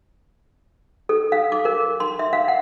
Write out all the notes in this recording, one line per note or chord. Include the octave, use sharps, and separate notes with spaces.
A4
F5
D6
A#4
C6
E5
F5
F#5